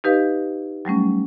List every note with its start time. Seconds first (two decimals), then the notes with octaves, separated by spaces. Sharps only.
0.04 D#4 G4 B4 D#5 F5
0.85 F#3 G3 A3 C#4